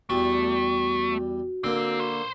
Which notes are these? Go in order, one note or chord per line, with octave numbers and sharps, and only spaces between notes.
E2 G3 A3 F#4
D3 A#3 C4
B4 C5